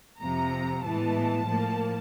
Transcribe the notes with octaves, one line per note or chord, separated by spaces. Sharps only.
F2 C3 F3 A#5
A2 E3 G#3 B3 A5
A2 F3 A#3